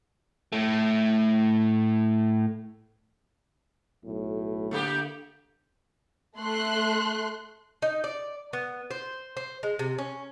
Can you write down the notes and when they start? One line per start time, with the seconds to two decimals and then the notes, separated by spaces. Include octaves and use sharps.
0.52 A2 A3
4.05 B1 A2
4.71 D3 A3 A#3 G4
6.37 A3 C6 F#6
7.82 D#4
8.04 D5
8.53 B3
8.91 C5
9.37 C5
9.63 G#3
9.79 C3
9.98 C#4